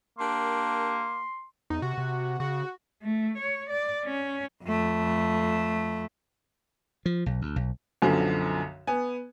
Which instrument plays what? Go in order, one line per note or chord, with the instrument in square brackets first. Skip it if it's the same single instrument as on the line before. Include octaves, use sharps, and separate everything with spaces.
[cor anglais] A#3 [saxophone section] D4 G4 A#4 [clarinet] C6
[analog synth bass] E2 [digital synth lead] D#4
[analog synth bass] C3 [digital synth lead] F#4
[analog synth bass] C3
[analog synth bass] C#3 [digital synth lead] F#4
[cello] A3
C#5
D5
C#4
F2 A3
[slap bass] F3
B1
D2
B1
[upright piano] B1 F#2 D3 F3
B3 G#5